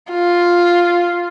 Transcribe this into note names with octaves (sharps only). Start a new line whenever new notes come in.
F4